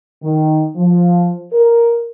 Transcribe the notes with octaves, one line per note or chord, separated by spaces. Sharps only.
D#3
F3
A#4